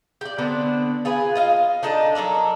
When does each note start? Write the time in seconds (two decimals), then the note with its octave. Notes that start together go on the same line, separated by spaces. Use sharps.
0.21 G4 D5
0.38 D3 B3 C4 D4
1.05 F4 G#4 B4
1.35 F4 D#5 F5
1.83 D4 D#4 A4 D#5
2.15 F#3 A4 A#4 D5